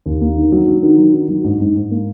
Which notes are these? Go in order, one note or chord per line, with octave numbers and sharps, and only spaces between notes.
D#2
A#3
D#3
F#3
F#3
D#3
F#3
D#3
F#3
G#2
G#2
G#2
A#3